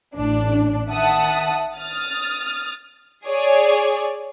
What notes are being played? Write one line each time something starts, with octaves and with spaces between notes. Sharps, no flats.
A1 D4
D#3 E5 F#5 A5 D#6
D#6 F6 A6
G#4 C#5 D5